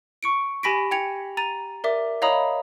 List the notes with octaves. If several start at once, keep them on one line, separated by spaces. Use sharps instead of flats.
C#6 C#7 D7
G4 G#5 B5 A#6 B6 D7
G5 G#6 C#7 F7
A#5 A6 D#7
A#4 D5 E5 D6
C#5 D#5 F5 A#5 B5 D#6